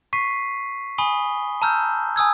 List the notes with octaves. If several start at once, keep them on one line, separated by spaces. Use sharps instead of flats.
C#6 B6 C7 D#7
G#5 B5 D#6 G7
A5 A#5 E6 F6 G6
G#5 D#6 E6 G#6